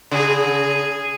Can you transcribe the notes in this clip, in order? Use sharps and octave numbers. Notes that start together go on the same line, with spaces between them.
C#3 G#4